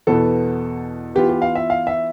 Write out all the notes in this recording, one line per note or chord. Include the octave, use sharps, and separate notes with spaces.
E2 B2 B3 A4
E3 B3 F4 G4
G4
F5
E5
F5
E5